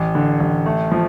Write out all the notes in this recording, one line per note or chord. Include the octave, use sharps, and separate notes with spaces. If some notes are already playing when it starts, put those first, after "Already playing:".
Already playing: A1
D3
A1
A3
F3